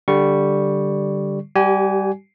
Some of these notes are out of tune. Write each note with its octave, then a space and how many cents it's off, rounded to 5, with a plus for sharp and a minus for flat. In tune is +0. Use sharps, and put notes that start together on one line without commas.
D3 -5 G3 +0 C#6 +0
G3 +0 G4 -35 G#5 +0